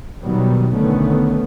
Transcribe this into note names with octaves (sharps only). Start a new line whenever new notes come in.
B2 D#3 F#3 G3 B3
B1 D3 D#3 A3 B3 C#4